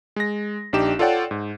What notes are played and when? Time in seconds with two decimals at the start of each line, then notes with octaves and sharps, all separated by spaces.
0.16 G#3 A#6
0.73 A#1 D4 D#4 G4 E7
0.99 F4 A4 C#5 D5 F#5 G5
1.31 G#2